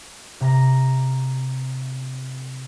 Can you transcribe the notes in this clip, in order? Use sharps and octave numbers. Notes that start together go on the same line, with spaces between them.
C3 A#5 A#6